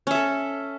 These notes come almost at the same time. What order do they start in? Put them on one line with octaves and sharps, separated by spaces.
C#4 E5 A4